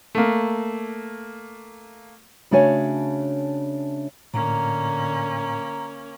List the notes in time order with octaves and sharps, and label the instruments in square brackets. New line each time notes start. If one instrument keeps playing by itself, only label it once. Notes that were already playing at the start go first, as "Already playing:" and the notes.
[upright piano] A3 A#3
[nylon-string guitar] C#3 A3 D4 F#4 C#5 G#5
[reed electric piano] A2 [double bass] D3 [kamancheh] A#3 C#4 [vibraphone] A#5